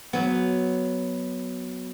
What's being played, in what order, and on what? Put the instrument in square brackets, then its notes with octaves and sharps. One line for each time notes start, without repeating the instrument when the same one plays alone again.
[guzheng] F#3 B3